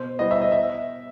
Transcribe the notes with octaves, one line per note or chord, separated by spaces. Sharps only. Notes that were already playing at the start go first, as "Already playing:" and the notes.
Already playing: B2 C5
G3 B3 E4 D#5
E5
D#5
E5